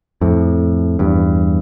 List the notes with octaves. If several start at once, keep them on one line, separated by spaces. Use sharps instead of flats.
F2 A2
E2 G2